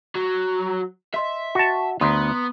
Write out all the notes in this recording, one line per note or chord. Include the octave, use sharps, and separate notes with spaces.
F#3
D#5 E5 C6 B6
F#4 A5
D2 B3 A#5 C6 D#6